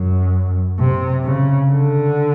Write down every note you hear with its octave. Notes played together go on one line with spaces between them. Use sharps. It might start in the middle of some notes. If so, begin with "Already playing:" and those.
Already playing: F#2
C3
C#3
D3